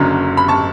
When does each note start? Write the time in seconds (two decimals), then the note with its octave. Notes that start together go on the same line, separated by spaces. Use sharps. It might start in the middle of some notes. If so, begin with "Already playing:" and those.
Already playing: F#1 F#2 D3 F#3
0.37 B5
0.48 A5 C#6